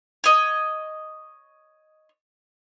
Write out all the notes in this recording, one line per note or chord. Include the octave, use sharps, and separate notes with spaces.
C#5 D#5